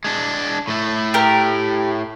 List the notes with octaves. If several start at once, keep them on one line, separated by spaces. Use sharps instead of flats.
G#3 D4
A2 A3
G4 A#4